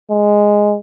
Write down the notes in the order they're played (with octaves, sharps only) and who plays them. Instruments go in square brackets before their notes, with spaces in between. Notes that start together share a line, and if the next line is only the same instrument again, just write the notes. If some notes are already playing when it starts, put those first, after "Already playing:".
[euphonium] G#3